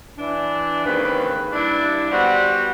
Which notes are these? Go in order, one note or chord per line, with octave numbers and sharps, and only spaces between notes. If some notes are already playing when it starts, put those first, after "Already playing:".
E3 D4
D#2 G#2 C#3 C4 B4
G2 D4 E4
G3 B3 F#4 C5 D5 F#5